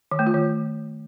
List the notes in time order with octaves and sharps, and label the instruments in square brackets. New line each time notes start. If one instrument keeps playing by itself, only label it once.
[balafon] D#3
A3
F4
D#3